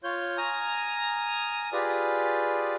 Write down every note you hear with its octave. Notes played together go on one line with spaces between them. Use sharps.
F4 C#5 G6
G#5 A#5 D#6 F6
F4 G4 G#4 B4 D5